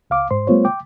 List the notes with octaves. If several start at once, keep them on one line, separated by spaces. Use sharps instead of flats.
C#2 F5 D6
G#2 C5 C6
G3 A3 B3 F4 C5 C#5
G5 D6